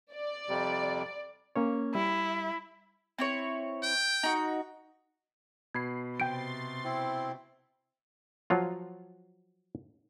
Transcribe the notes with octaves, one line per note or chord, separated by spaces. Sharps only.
D5
F2 C3 G3
A#3 C#4 C#5
G3 E4
C4 E4 C#5
G5
D#4 F#4
B2 B5 G#6 C7
C3 G5 C6 G6 A6 D7
C4 E4
F3 F#3 F4